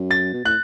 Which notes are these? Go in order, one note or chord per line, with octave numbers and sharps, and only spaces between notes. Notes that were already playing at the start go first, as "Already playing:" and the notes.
Already playing: F#2
A6
B2
A2 F#6